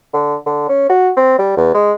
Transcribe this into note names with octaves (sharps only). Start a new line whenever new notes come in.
D3
D3
C#4
F#4
C4
G3
E2
G#3